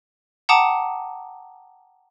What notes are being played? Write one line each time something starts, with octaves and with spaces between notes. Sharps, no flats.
F#5 G5 A5 A#5 D6 D#6